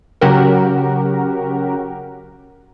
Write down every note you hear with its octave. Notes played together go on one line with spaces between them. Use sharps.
C#3 F#3 F#4 G4 A#4